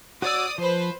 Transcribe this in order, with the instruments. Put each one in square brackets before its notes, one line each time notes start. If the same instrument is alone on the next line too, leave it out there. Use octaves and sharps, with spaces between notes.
[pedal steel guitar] F#4 C#5 E6 [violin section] D5 D#6
[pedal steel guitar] F3 [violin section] B4 C5